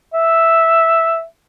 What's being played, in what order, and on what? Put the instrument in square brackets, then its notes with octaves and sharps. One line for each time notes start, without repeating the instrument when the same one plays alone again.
[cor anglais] E5